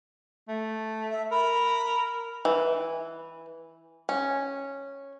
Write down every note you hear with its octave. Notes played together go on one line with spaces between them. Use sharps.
A3
E5
A#4 B5
E3
C#4